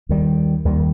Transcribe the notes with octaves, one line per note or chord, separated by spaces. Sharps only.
D#2 D#3 G3
D#2 D#3 G3